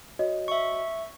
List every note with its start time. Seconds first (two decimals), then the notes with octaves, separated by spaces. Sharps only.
0.19 F#4 C#5 D#5
0.48 E5 C#6